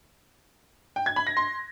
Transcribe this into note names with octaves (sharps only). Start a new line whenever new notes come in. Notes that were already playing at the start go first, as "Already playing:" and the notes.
G5
G#6
B5
A#6
C6